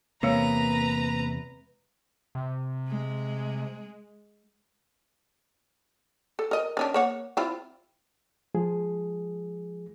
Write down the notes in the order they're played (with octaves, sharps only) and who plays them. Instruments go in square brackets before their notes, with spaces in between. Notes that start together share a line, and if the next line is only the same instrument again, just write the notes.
[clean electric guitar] E2 C3 [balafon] G#3 C#5 [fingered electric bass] A#3 [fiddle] B4 A#5
[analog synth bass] C3
[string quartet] G#3
[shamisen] A4
A#4 D#5
D#3 C#4 D4
A#3 C#5 F#5
C4 E4 F4
[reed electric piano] F3 G#3 G#4